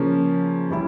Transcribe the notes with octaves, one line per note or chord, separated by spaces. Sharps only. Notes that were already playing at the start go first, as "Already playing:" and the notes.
Already playing: C#3 F3 A#3 C#4
E3 G3 C#4 E4